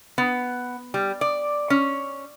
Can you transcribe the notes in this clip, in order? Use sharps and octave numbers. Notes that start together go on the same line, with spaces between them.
B3
G3
D5
C#4